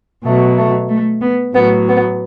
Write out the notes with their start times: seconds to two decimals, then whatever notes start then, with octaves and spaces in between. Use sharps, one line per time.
0.25 B2 F#3 A3
0.58 A3
0.90 A3
1.22 B3
1.54 A2 F#3 B3
1.88 B3